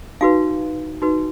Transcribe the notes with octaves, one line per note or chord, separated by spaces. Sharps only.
D#4 F#4 B4 F5
D#4 F#4 B4